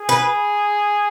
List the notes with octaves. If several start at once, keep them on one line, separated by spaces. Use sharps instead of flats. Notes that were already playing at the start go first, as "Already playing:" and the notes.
Already playing: G#4
B4